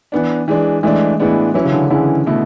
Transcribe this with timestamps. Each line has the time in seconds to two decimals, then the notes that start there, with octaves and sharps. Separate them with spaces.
0.12 E3 B3 D4
0.48 E3 G#3 D4
0.83 E3 G#3 A3 D4
1.20 A2 E3 G#3 B3 D4
1.54 E3 F#3 C#4 E4
1.65 C#3
1.72 D3
1.90 D3 E3 G#3 C#4 E4
2.26 B2 A3 E4